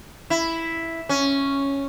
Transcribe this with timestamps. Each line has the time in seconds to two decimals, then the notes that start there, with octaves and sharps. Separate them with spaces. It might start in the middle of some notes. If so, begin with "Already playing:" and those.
0.30 E4
1.09 C#4